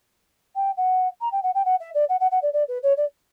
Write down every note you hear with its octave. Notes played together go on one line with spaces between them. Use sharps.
G5
F#5
A#5
G5
F#5
G5
F#5
E5
D5
F#5
F#5
F#5
D5
D5
B4
C#5
D5